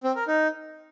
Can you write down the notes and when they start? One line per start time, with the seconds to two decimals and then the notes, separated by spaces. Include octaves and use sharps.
0.04 C4
0.16 A#4
0.27 D#4